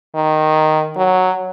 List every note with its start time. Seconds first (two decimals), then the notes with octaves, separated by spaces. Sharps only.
0.16 D#3
0.96 F#3